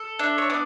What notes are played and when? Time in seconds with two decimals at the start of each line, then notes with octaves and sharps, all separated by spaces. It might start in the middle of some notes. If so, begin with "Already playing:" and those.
Already playing: A4
0.19 D4 E5
0.38 C#5
0.50 B3 D5